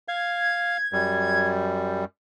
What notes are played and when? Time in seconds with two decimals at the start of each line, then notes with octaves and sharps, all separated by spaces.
0.08 F5 G#6
0.93 F#2 G3